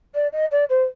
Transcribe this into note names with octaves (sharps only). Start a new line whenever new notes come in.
D5
D#5
D5
C5